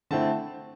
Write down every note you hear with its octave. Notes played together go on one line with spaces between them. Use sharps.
D3 A3 C4 E4 A5